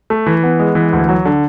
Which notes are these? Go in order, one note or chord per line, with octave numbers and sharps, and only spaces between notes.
A3
E3
B3
G#3
E3
D2
F#3
D3